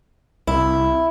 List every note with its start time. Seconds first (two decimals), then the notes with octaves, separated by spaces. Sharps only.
0.47 C2 E4